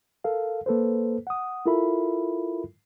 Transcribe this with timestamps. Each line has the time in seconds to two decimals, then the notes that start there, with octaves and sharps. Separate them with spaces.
0.24 A4 A#4 F5
0.66 A#3 A4 B4 C5
1.27 F#5 D#6
1.66 E4 F4 A4 A#4 E5 B5